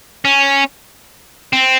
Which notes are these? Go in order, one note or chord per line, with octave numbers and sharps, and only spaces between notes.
C#4
C4